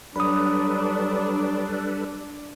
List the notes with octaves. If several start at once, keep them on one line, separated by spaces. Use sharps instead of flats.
F#3 G3 D4 A4 B4 B5 D#6